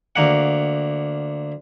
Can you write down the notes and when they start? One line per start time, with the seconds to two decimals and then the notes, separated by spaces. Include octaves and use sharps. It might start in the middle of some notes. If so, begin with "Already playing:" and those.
0.16 D2 A#3 F#5